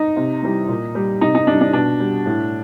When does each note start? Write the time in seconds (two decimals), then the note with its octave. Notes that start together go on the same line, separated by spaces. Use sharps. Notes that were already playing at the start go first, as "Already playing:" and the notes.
Already playing: D#4
0.16 C3
0.42 E3 G3
0.68 A#2
0.95 G3
1.21 C3 D#4
1.35 D#4
1.47 E3 G3 D4
1.61 D4
1.73 B2 D4
2.00 G3
2.26 A2